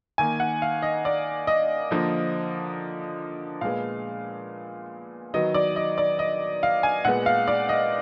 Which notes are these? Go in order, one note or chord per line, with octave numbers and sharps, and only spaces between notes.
D#3 A#3 G#5
F#5
F5
D#5
D5
D#5
D3 F3 A#3
A#2 G#3 B3 F5
D#3 F#3 B3 D#5
D5
D#5
D5
D#5
F5
G#5
A#2 G#3 B3 F#5
F5
D5
D#5